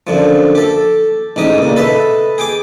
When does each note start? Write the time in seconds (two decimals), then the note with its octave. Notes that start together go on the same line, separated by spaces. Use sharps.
0.07 F#2 D3 F3
0.55 G4 A4
1.36 A1 G#2 G4 D#5 D#6
1.58 C#2 A#2
1.76 A4 B4 D#5 E5
2.38 G#4 G5 D6